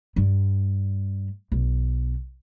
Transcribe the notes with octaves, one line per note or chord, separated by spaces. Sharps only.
G2 G3
B1